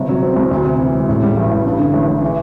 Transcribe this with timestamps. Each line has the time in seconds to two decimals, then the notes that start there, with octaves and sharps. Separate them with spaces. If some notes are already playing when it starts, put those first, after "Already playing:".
Already playing: G1 C3
0.09 F#3
0.22 C4
0.36 C2
0.51 D2
0.65 C3
0.79 E3
0.94 E1
1.09 A2
1.23 G3
1.37 A1
1.51 A1
1.66 G2
1.79 D3
1.94 A1
2.08 A1
2.22 E3